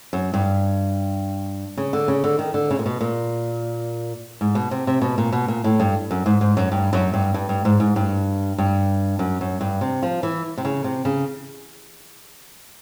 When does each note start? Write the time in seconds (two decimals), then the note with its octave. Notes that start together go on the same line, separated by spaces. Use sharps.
0.13 F#2
0.34 G2
1.77 C#3
1.93 D3
2.08 C#3
2.24 D3
2.39 D#3
2.54 D3
2.70 C#3
2.79 A#2
2.86 B2
3.01 A#2
4.41 G#2
4.55 B2
4.71 C3
4.87 C3
5.02 B2
5.18 A#2
5.32 B2
5.48 A#2
5.64 A2
5.80 G2
6.11 F#2
6.26 G#2
6.41 G#2
6.57 F#2
6.72 G2
6.93 F#2
7.14 G2
7.34 G2
7.49 G2
7.65 G#2
7.80 G#2
7.96 G2
8.58 G2
9.19 F#2
9.41 F#2
9.61 G2
9.81 C3
10.02 F3
10.23 E3
10.58 C3
10.65 C#3
10.84 C3
11.05 C#3